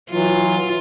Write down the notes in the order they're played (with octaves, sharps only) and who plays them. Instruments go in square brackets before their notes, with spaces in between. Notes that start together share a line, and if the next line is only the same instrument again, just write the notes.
[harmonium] E3 F#3 [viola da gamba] F4